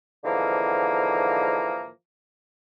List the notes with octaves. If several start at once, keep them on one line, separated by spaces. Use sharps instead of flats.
G#2 D3 E3 F3 A#3